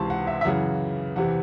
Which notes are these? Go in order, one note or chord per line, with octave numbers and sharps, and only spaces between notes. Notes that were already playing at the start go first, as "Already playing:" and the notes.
Already playing: C#2 C3 E3 A5 C6 C#6
F#5
E5
E5
F#2 C#3 E3 F#5
E2 C3 E3 F#5